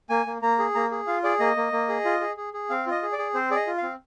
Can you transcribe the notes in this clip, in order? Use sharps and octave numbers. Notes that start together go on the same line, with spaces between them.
A#3 G#5
A#3
A#3 A#5
G#4
A#3 A#5
G#4
F4 F5
G#4 D5
A#3 D#5
A#3
A#3
G#4
F4
G#4
G#4
G#4
C4 F5
F4 D#5
G#4
D5
G#4
C4 C5
G#4 D5
D#5
F4
C4 F5